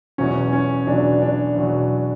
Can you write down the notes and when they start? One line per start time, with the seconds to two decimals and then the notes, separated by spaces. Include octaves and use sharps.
0.18 E2 B2 F#3 C#4
0.53 C#4
0.87 E2 B2 F#3 D4
1.22 D4
1.56 E2 B2 F#3